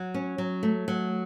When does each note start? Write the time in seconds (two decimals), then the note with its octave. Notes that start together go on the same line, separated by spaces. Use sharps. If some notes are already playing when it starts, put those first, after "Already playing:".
Already playing: F#3
0.14 C#4
0.38 F#3
0.63 A3
0.88 F#3